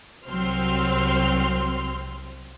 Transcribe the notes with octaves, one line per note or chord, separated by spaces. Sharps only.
C2 F#3 C4 C6 F6